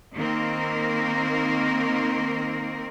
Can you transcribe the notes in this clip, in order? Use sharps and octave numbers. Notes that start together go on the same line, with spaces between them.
D#3 A#3 C4 A#4